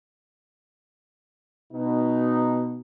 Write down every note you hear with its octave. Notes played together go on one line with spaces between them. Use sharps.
B2 D#4